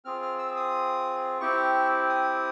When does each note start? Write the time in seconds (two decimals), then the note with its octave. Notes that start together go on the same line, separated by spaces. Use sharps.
0.05 C4 F4 G#4 F6
0.22 F6
0.39 E6
0.56 D#6
1.41 C4 E4 G4 C#6
2.09 D#6